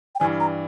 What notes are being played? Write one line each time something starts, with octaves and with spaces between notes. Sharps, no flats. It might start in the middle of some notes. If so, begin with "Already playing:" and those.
G5
G2 E3 G3 G#5
A#5